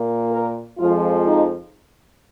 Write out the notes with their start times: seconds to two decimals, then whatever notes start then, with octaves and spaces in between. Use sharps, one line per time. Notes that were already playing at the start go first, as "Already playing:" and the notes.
Already playing: A#2 A#3
0.32 A#4
0.78 F2 F3 G#3 F4
1.26 D#4